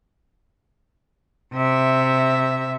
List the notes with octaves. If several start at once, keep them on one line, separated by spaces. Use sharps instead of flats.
C3 E5